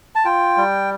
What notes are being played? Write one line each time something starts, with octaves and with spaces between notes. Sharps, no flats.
A5
F4 G5
G3